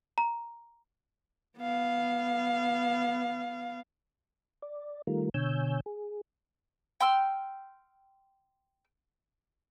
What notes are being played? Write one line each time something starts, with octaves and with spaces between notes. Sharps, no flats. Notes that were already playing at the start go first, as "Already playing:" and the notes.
A#5
B3 F5
D5
D#3 G3 A3 F4 A#4
B2 D3 C#5 G#5 E6 G6
G#4
G5 C6 E6 F6